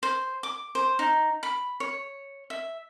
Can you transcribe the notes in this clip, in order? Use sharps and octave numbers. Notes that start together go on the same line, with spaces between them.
C5
D6
C5
D#4
B5
C#5
E5